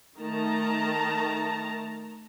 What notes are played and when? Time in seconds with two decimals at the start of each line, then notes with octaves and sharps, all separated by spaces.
0.19 D#3 A3 A5 A#5